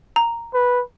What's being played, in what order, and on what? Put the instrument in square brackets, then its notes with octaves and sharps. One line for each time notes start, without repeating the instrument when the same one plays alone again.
[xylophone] A#5
[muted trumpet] B4